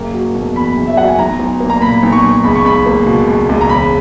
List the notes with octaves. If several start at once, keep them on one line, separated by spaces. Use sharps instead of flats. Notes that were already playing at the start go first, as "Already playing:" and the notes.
Already playing: F#1 A#3
F#3
B2
E2 B5
F#1
E5
F#3 F#5
G#5
B1 A#5
B1
A#3
A#5
A#2 B5
B1
C#6
B1
C#2 B5
C#6
C#2 B5
A#3
B2
C#2
C#2
A#5
E1 B5